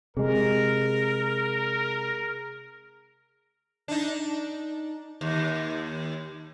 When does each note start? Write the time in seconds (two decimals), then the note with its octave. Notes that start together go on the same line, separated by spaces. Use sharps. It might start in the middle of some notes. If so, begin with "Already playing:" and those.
0.17 C3 G#3 G#4 A#4
3.88 D4 D#4
5.21 D#2